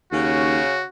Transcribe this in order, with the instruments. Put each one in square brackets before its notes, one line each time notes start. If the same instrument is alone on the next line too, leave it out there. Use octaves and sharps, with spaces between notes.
[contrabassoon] D#2 [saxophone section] C#3 C#4 [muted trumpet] F#4